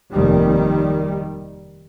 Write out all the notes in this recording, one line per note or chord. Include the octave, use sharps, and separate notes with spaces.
F1 D#2 D#3 G3